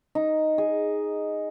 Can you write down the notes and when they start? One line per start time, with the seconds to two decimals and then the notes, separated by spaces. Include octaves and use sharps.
0.15 D#4
0.58 G#4